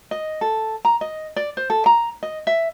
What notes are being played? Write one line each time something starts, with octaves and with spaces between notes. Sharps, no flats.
D#5
A4
A#5
D#5
D5
C5
A4
A#5
D#5
E5